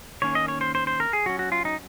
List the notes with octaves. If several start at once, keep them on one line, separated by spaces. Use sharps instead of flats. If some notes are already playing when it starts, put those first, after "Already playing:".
D#3 A#3 C#4 C#5
D#5
C#5
C5
C5
C5
A#4
G#4
F#3 C#4 F#4
F#4
F4
D#4